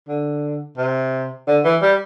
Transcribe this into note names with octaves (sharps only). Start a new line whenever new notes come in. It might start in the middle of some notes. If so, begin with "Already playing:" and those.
D3
C3
D3
E3
G3